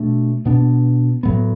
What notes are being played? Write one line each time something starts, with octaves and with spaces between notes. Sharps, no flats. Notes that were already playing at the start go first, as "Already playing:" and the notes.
Already playing: B2 A3 D4
B2 B3 D4
A2 F#3 B3